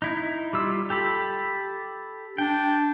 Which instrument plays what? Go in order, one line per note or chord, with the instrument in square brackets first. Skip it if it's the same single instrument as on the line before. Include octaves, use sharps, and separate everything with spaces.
[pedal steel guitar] D#4 E4
G3 F4 E6
G4 A4 B5
[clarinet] D4 [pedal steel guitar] G5